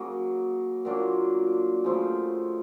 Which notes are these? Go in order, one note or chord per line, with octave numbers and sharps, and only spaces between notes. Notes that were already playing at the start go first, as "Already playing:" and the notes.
Already playing: C#3 F#3 A#3
A#2 F#3 A#3 D4
C#3 F3 A3